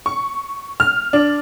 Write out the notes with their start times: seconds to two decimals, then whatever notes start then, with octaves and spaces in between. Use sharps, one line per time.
0.06 C#6
0.80 F6
1.13 D4